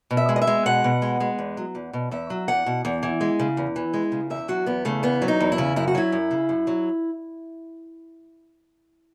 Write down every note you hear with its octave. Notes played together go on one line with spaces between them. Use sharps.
B2
E5
G#3
D#5
E5
G#3
B2 F#5
B2
G#3
G#3
E2
F#3
E2
B2
E2 E5
F#3
E2 F#5
B2
E2
E3
G#3
C#3
E2
E3
G#3
C#3
E2 E5
F#3 F#4
E2 B3
C#3 A3
E2 B3
F#3
D#4
E2
E4
C#3
F#2 E4
F#4
F#3 E4
F#2
C#3
F#2
F#3